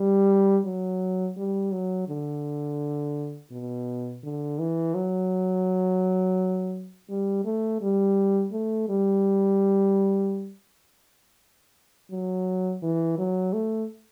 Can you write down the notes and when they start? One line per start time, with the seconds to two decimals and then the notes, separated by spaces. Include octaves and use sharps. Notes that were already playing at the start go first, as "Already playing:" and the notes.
Already playing: G3
0.65 F#3
1.37 G3
1.72 F#3
2.08 D3
3.52 B2
4.24 D3
4.59 E3
4.94 F#3
7.09 G3
7.45 A3
7.81 G3
8.52 A3
8.89 G3
12.11 F#3
12.82 E3
13.18 F#3
13.53 A3